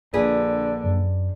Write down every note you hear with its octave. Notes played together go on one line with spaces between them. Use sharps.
A#1 A#2 D3 G#4 B4
F#2